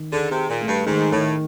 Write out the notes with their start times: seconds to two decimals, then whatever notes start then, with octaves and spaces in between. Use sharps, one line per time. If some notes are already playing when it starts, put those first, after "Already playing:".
Already playing: D#3
0.12 D3 G#4
0.31 C3
0.37 G#4
0.49 A#2
0.61 A3
0.68 G2
0.86 G#2 D#3
1.12 A2 D#3